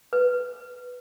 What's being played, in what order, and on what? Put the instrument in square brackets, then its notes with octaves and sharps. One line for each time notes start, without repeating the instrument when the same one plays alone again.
[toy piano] B4